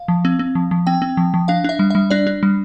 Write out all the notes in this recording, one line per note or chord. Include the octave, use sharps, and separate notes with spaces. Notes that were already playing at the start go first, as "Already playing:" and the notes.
Already playing: F5
F3
C4
C4
F3
F3
C4 G5
C4
F3
F3
D4 F5
D4 E5
G3
G3 E5
D4 D5
D4
G3